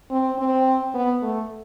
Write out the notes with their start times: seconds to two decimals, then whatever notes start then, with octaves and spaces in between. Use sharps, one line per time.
0.10 C4
0.39 C4
0.94 B3
1.23 A3